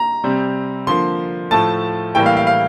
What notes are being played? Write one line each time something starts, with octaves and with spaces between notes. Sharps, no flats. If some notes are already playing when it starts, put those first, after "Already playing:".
Already playing: A#5
C3 G3 C4
D3 F3 A#3 C6
A2 F3 A3 A5
A2 E3 G3 A#3 G5
F5
F5
F5